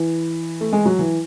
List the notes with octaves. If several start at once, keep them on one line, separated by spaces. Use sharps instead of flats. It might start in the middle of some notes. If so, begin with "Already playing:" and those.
Already playing: E3
A3
G#3
F#3
E3